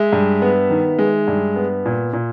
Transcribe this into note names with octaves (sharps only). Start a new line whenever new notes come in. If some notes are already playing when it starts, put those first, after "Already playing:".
Already playing: G#3 E5
G2
B3
D#3
G#3
G2
B3
A#2
A#2